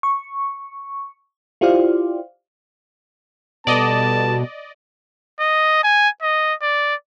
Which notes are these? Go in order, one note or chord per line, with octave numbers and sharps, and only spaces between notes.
C#6
E4 F4 G4 C5 D5 F5
B2 G3 B3 A4 D5 D#5 A5
D#5
G#5
D#5
D5